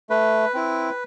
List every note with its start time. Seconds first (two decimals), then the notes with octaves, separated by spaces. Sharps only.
0.10 A3 B4
0.54 C4 E4